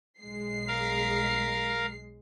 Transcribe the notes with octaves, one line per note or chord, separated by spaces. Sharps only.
B1 G#3 C7
A#4 F5